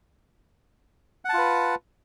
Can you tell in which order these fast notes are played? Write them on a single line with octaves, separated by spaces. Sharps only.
F#5 A5 F4 B4